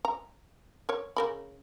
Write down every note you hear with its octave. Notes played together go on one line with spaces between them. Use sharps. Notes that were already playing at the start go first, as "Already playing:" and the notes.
A#5
A#4 C#5
C#3 A#4 B5